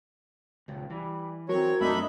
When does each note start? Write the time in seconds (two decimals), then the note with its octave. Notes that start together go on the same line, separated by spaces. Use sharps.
0.68 D#1 C#2
0.90 E3 G3
1.49 F#3 C4 F#4 A#4 C#5
1.81 F#2 A3 C4 D4 D#4 E5 B5